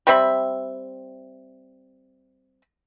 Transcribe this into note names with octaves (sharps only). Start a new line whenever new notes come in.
G3 C4 E5 B5